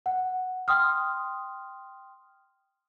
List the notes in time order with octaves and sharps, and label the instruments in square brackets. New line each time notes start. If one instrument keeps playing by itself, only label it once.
[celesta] F#5
G5 C6 D#6 F6